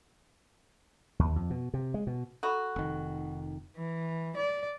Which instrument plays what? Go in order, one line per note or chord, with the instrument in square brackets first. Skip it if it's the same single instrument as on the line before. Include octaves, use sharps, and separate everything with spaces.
[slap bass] D#2
F2
B2
C3
G#3
B2
[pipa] F#4 [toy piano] A4 B5
[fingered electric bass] F1 D#3
[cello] E3
D5